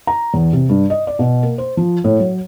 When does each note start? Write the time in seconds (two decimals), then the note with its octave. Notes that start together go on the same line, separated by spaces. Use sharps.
0.07 A#5
0.34 E2
0.53 C3
0.69 G2
0.90 D#5
1.07 D5
1.19 B2
1.43 A#3
1.58 C5
1.77 F3
2.04 A2
2.20 F#3